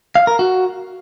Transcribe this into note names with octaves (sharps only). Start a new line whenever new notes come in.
F5
A#4
F#4